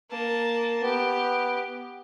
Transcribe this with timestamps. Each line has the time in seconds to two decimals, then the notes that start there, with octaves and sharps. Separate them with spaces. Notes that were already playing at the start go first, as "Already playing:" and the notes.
0.11 A#3 A5
0.83 B3 G4